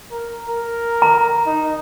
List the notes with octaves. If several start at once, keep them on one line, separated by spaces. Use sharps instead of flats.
A#4
A#4
A#5
D#4